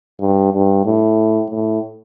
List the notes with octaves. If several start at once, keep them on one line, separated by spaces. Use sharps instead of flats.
G2
G2
A2
A2